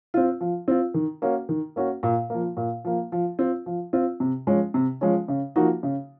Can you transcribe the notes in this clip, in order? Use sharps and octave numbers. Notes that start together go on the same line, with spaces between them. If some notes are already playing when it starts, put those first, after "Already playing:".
C4 F4
F3
C4 F4
D#3
A#3 C#4 F#4
D#3
A#3 C#4 F#4
A#2
F3 A#3
A#2
F3 A#3
F3
C4 F4
F3
C4 F4
C3
F3 G#3 C#4
C3
F3 G#3 C#4
C#3
F3 A#3 D#4 F#4
C#3